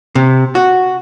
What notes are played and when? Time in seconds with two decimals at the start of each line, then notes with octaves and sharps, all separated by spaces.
0.15 C3
0.55 F#4